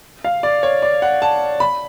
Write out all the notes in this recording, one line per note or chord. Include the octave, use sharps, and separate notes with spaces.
F5
D5
C#5
D5
F#5
A5
B5